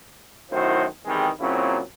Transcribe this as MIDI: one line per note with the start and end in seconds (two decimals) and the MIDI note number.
0.52 0.85 42
0.52 0.85 45
0.52 0.85 51
0.52 0.85 64
0.52 0.85 66
0.52 0.85 72
1.06 1.29 40
1.06 1.29 48
1.06 1.29 51
1.06 1.29 52
1.06 1.29 55
1.06 1.29 56
1.41 1.80 46
1.41 1.80 49
1.41 1.80 54
1.41 1.80 60
1.41 1.80 64